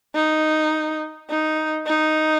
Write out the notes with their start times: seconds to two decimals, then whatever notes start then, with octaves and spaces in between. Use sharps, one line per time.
0.15 D#4
1.29 D#4
1.86 D#4